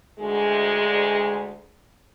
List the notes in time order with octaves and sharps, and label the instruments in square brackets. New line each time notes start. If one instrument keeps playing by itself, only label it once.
[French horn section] D2 G#3